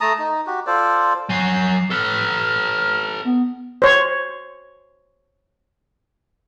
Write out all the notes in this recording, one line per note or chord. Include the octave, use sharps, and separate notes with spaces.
A3 A5 A#5 D#6
D#4
F#4 G4
F4 A4 C5 D5
F#3 G#5 C7
A4 B4 F6
B3
C5 C#5